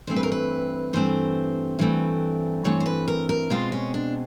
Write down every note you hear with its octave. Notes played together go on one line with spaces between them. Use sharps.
G2 E3 A3 C4 C5
B4
A#4
B4
G2 E3 A3 C4 C5
G2 E3 A3 C4
G2 E3 A3 C4 C#5
C5
B4
A#4
A#4
B2 G#3 C4 F4
C#4
D4